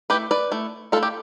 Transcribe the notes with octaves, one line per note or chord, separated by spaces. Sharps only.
A3 E4 G4 B4
B4 D5
A3 E4
A3 E4 F4 A4
G4